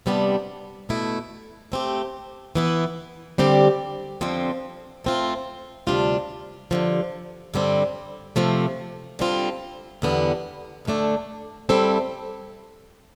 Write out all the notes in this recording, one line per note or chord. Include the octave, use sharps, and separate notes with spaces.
C3 G3 B3 D4
B2 A3 E4
A3 C4 G4
E3 B3 E4
D3 G3 C4 G4 D5
F2 D3 F3 C4
A3 C4 F4
D2 C3 G3 D4 F4
G2 D3 F3
G2 D3 G3 C4
C3 F3 A3
D3 G3 C4 F4
E2 D3 G3 B3
D2 D3 A3 D4
G3 C4 E4 A4